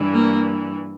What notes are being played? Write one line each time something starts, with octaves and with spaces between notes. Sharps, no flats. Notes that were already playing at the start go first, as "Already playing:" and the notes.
Already playing: G2 E3
A#3